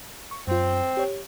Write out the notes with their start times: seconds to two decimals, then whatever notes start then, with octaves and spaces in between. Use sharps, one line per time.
0.31 C#6
0.47 F#2 C4 F4
0.97 G4 C#5